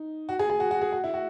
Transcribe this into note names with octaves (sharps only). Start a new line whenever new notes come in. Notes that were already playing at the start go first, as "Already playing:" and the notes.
Already playing: D#4
F#4
G#4
G#4
F#4
F#4
G#4
F#4
E4
F#4